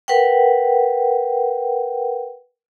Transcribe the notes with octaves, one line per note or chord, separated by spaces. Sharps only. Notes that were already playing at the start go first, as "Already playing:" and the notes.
A#4 B4 F#5 G5